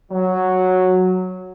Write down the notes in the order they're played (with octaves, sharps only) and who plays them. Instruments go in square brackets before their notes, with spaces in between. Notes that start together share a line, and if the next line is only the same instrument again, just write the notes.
[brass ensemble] F#3